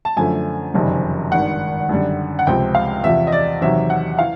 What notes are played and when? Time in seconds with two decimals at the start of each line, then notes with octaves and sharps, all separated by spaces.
0.05 A5
0.17 F#2 D3 F3 A3 G#5
0.74 F#1 F2 C3 D#3 G3
1.32 G#1 G2 D#3 F#5
1.89 F#2 D3 G3
2.39 F#5
2.47 C#2 C3 F3 G5
2.75 F5
3.03 E2 C3 F3 E5
3.27 D#5
3.32 D5
3.61 E2 C3 D#3 F#3 E5
3.90 F#5
4.19 E3 F5